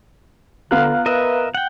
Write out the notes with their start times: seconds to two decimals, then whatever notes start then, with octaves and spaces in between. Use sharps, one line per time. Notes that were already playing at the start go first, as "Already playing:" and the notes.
0.71 D3 B3 F4 F5 A#5 F#6
1.06 A#4 B4 D#5 E5
1.55 F#5 G5